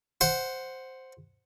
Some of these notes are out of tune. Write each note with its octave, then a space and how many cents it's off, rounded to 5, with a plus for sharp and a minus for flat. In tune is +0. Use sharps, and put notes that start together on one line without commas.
C5 +0 F#5 +0